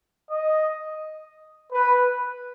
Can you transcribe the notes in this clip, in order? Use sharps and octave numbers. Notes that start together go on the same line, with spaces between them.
D#5
B4